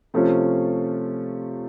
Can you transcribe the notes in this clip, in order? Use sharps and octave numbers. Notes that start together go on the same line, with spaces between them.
C3 F3 A3 C#4 F4